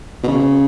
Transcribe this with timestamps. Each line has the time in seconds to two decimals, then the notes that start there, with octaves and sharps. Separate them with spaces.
0.23 B2
0.28 C#3